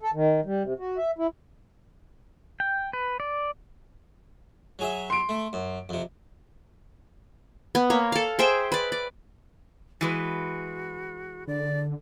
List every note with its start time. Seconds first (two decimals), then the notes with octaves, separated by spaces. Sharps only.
0.01 A4
0.14 D#3
0.45 G3
0.63 C3
0.79 F#4
0.97 E5
1.18 E4
2.60 G5
2.93 B4
3.20 D5
4.79 F#3 G#4 E5
5.10 C6 D7
5.29 A3
5.53 F#2
5.89 F2 C3
7.75 B3
7.90 A#3 C#5
8.12 A4 F5
8.39 G#4 C5 E5 G5
8.72 B4 D5
8.92 D5
10.01 E3 G#3 F#4 B4
11.48 D3 D5